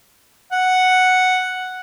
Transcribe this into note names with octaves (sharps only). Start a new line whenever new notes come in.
F#5